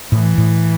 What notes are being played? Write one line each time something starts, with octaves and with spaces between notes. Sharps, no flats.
A2 E3
A2